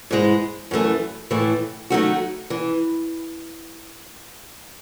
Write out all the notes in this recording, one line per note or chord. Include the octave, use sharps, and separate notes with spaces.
G#2 E3 G#3
F#2 E3 A3
A2 E3 A3
D#3 F#3 A3 D#4 F#4
E3